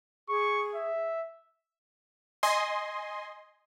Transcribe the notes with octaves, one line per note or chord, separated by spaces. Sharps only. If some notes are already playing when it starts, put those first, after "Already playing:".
G#4 C#6
E5
D#5 G#5 C6